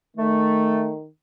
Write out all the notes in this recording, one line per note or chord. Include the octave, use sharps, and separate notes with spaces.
D#3 A3